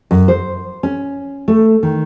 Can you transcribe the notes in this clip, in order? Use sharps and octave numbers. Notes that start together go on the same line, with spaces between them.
F#2
C5
C#4
A3
D#3